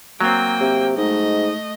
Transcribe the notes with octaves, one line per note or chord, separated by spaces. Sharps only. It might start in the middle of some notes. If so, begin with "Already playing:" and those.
F#3 A#3 C4 G5
C3
G#2 A3 D#5